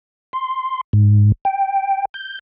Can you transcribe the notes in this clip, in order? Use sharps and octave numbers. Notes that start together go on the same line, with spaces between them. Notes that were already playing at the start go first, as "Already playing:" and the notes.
C6
G#2
G5
G6